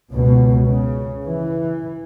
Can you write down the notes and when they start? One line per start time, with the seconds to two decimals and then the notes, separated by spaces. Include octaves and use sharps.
0.13 C#2 B2
0.68 C#3
1.25 E3